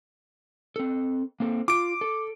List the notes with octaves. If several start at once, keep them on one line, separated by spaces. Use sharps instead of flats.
C4 A4
A#3 C4 A4
F4 D6 D7
A4